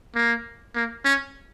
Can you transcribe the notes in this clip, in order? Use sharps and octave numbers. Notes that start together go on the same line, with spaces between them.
A#3
A#3
C#4